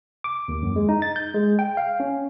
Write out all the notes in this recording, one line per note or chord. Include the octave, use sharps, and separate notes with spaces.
D6
D#2
F#2
G#3
D#4
A6
G6
G#3
G5
F5
C#4